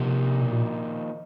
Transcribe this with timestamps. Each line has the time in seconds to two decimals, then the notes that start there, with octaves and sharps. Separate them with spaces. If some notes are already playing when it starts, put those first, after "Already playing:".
Already playing: C3 F3 A#3 D#4
0.41 B2
0.52 A#2